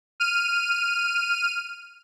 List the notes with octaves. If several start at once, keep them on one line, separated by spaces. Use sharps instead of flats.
F6 D#7